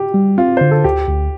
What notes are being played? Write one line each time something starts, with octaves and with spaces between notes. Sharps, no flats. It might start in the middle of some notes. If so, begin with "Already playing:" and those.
Already playing: G4
G3
C4 F4
D3 C5
A4
D2 G4
D2